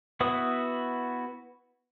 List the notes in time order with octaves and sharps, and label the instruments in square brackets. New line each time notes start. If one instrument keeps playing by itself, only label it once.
[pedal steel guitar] B3 E4 F#4 B4 D#6